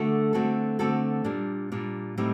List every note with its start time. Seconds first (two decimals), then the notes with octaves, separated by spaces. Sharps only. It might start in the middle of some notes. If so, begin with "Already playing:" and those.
Already playing: D3 A3 D4 F#4 A4
0.33 D3 A3 C4 F#4 A4
0.79 D3 A3 C4 F#4 A4
1.24 A#2 G3 D4
1.72 A#2 G3 D4
2.18 A2 G3 C4 D#4